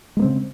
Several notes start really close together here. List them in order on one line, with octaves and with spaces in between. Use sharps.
G#3 A#3 C4 C#3